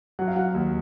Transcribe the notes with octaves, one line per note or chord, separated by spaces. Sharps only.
F#3 F#5
F5
F#3 F#5
D#2